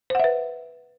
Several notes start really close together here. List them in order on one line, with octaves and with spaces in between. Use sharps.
C5 F#5 E5 B4